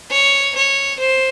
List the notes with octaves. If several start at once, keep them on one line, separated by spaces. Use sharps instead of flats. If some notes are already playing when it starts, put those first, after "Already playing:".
C#5
C#5
C5